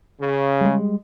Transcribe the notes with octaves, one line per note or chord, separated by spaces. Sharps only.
C#3
G3 G#3